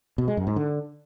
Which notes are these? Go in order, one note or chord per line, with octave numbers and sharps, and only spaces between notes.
B2
G#3
F#2
G#2
D3